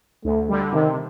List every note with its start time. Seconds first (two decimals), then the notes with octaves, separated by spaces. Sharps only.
0.25 D2 A3
0.49 D3 G3
0.73 C3 D#3